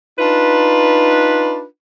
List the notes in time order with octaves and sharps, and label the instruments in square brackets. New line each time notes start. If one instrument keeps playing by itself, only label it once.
[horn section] D4 D#4 F4 B4